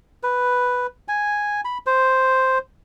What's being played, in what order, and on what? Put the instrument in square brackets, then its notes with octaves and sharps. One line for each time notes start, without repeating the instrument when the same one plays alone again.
[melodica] B4
G#5
B5
C5